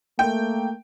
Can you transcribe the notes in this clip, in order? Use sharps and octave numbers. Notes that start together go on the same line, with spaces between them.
A3 A#3 G5